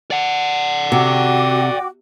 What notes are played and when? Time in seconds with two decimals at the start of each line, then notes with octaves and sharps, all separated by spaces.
0.11 D5 F#5
0.92 C3 F#4 G5 D6